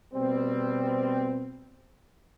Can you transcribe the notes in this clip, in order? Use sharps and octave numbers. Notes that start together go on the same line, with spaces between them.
B2 G3 C4